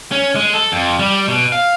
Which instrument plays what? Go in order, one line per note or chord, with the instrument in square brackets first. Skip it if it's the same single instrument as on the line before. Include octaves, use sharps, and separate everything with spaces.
[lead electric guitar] C#4
G#3
A4
F2
G3
B2
F5